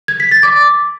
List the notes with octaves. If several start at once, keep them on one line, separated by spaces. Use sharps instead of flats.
G#6
B6
A6
D6